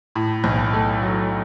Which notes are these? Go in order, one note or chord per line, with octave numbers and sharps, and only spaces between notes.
A2
B1
A3
F#3